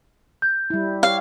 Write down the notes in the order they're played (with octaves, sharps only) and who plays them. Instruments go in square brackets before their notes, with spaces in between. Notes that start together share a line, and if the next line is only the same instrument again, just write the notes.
[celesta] G6
[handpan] G3 E4
[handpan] G4 C#5 [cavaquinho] F5